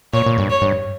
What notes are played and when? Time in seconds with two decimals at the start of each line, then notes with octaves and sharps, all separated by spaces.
0.13 A#2 C#5
0.26 A#2
0.38 G2
0.50 C#5
0.62 G2